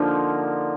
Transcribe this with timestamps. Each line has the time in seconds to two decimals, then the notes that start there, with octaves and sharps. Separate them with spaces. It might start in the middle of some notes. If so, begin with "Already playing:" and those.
Already playing: D3 F3 A#3 D#4